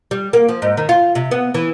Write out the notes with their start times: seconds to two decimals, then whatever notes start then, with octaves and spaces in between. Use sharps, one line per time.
0.11 G3
0.33 A#3
0.49 F3
0.62 G#2
0.77 D#3
0.89 F4
1.15 C3
1.31 B3
1.54 E3